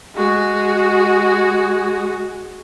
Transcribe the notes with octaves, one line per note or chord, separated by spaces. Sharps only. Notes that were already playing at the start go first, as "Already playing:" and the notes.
G#3 F#4